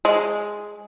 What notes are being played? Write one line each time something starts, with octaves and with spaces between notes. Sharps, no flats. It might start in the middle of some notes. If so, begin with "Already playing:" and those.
G#3